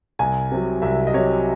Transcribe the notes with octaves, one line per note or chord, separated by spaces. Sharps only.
C2 G#5
C3 F#3
C2 E5
D#5
C3 F#3 C#5